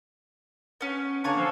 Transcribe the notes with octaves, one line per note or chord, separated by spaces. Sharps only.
B3 C#4
D3 A#3 D4 C#5 G#5 C#6
F3 A4 F5